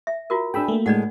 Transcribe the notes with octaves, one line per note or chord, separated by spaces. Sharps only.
E5
F4 F#4 A#4
D4 G#4 G5 B5 E6
A3 A#3
A2 G#3 D4 D5 F#5